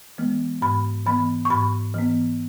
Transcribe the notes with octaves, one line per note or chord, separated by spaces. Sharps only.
E3 G#3 B3
G#2 B5
E3 B3 B5
C#6
G#2 B5
E3 B3